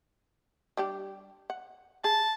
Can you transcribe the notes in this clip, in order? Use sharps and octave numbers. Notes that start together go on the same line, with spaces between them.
G3 D4 G4
F#5
G#4 A5